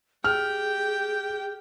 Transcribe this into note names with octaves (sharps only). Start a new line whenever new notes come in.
G4 G#4 G5 F6